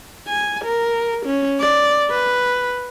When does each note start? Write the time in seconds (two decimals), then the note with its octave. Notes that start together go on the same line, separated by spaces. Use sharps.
0.28 G#5
0.65 A#4
1.26 C#4
1.60 D5
2.11 B4